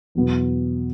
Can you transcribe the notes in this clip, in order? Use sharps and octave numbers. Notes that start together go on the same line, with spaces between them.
E2 B2 F#3 B3